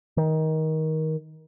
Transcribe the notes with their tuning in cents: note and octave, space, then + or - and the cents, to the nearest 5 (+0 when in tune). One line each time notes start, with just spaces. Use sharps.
D#3 +20